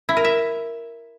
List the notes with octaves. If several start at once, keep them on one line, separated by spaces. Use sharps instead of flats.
E4
A#4
E5